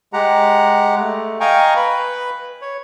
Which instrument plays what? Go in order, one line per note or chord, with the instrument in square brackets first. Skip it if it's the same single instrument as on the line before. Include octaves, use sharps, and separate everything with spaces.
[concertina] G#3 G4 F#5 A#5
A3
D#5 F5 G5 G#5 A#5 C#6
B4 B5
C#5